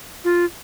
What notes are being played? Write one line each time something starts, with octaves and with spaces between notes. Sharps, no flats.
F4